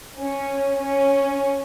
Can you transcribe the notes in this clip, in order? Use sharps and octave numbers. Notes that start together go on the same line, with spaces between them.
C#4
C#4